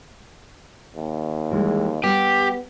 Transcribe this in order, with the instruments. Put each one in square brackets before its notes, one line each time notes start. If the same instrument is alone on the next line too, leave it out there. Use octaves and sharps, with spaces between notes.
[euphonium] D#2
[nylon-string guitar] E3 G3 G#3
[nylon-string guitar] G3 [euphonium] B3 [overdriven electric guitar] G4